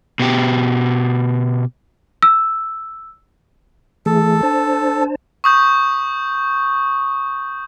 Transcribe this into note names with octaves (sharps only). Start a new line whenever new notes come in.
B2 G4
E6
E3 A3 G#4 A4
D4 C5 A5
C#6 D#6 G6